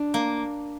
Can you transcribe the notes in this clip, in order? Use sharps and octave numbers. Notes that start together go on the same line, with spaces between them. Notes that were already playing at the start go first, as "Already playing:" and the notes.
Already playing: D4
A#3